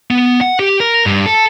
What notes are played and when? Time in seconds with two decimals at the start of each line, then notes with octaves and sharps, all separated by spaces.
0.11 B3
0.41 F#5
0.59 G4
0.80 A#4
1.06 G2
1.26 A4